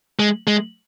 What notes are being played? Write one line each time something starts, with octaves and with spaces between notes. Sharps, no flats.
G#3
G#3